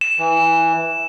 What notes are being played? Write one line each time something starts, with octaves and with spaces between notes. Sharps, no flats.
E7
E3